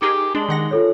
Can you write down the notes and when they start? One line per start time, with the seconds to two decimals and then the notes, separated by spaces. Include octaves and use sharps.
0.02 D#4 G4 G#4 A#4
0.35 G#3 D4
0.49 D#3 F#5 A#6
0.71 F4 A4 C#5